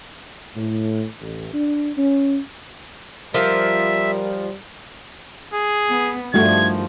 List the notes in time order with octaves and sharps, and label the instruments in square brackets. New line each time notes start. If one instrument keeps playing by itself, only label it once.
[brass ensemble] A2
A1
D4
C#4
[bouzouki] F3 [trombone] G3 [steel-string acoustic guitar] A#4 [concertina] E5
[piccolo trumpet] G#4
[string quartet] B3
[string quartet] G2 D#3 F3 [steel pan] G3 A3 F#4 [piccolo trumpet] G#6